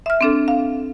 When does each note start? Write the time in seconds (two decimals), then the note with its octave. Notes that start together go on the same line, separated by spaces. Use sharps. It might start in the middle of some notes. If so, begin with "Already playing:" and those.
0.06 E5 F6
0.21 C4 D4 A4
0.48 F5